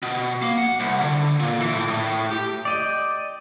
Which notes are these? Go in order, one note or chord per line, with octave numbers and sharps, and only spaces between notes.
B2
A#3
F#5
C2
D3
A#2
E3
A2
A2
G4
D5 D#5 G5